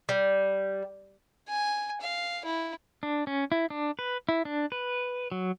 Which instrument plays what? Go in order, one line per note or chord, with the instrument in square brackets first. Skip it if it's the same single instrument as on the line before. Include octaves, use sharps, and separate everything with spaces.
[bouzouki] G3
[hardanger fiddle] G#5
F5
E4
[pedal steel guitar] D4
C#4
E4
D4
B4
E4
D4
B4
F#3